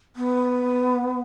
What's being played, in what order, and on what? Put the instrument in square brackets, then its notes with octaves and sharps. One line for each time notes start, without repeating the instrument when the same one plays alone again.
[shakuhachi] B3